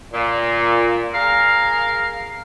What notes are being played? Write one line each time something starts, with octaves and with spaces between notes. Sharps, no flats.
A#2
G#4 A#4 F5